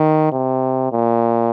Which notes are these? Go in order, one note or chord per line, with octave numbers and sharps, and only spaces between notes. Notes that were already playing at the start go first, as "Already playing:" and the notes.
Already playing: D#3
C3
A#2